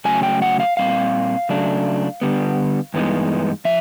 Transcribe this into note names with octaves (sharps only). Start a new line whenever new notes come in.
C#3 F#3 A3 C#4 G#5
G5
F#5
F5
A#2 G3 C4 F5
C#3 F#3 A3 D4
D3 G3 B3
G2 E3 G#3 B3 D#4
F3 E5